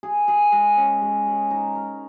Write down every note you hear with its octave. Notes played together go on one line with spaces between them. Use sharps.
G#4
G#4
G#3
C#4
G#3
G#3
D#4
A#4